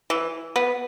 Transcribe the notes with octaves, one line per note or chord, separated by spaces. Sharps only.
E3
B3